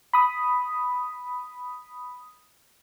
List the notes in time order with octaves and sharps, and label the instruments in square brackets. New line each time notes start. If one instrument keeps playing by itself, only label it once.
[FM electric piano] B5 D#6